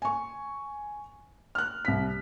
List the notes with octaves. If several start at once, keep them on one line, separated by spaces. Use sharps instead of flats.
G#5 C#6
F6 F#6
C2 B6